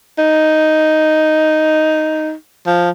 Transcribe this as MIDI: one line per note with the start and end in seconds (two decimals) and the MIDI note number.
0.19 2.33 63
2.67 2.90 53